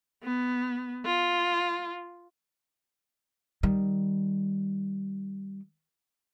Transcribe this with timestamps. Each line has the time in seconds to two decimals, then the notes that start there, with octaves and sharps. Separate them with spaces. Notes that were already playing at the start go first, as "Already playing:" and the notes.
0.23 B3
1.05 F4
3.63 D#3 G3